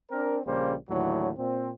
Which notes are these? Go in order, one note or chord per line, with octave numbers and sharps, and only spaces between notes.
C4 D4 A#4
A#1 C#3 G3 A#3 C5
D#2 A2 D3 E3 F#3
A#2 C4